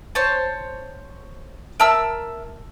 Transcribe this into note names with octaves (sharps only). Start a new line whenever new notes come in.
C5 C#5 A5
A#4 E5 A5 E6